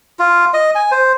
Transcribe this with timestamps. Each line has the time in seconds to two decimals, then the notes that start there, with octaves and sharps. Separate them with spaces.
0.19 F4
0.54 D#5
0.75 G#5
0.91 C5